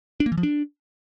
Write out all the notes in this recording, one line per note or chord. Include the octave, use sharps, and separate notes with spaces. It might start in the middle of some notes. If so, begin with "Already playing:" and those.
D4
A#3
E3
F3
D4